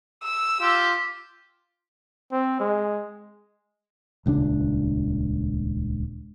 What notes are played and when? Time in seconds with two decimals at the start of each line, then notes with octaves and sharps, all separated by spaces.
0.23 E6
0.61 F4 G4
2.32 C4
2.60 G#3
4.26 D#1 C#2 C4 D4